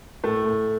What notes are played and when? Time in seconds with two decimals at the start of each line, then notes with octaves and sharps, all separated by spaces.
0.24 A2 A3
0.45 A2